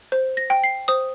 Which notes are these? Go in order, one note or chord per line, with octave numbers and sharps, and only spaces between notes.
C5
A#6
G5
C7
C5 D#6